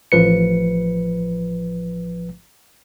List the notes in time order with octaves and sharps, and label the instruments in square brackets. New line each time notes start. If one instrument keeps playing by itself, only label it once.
[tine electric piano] A1 F3 B4 C#7